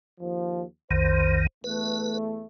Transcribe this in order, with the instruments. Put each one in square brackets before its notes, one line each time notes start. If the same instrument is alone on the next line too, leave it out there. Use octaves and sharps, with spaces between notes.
[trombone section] D#2 F3
[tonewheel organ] B1 F2 D#3 [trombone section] C5
[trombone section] E2 A3 [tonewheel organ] B4